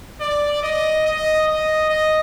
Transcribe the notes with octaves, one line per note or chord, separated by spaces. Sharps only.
D5
D#5
D#5
D#5
D#5